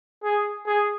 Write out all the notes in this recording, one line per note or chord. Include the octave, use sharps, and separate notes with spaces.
G#4
G#4